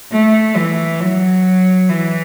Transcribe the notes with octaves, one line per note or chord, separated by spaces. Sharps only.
A3
E3
F#3
E3